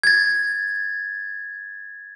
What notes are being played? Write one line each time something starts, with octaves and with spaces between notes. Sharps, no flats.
G#6 A6